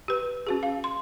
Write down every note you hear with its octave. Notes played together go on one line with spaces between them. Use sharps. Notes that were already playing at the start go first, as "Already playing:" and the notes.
G4 B4
C#4 F#4 G#4
F5
C6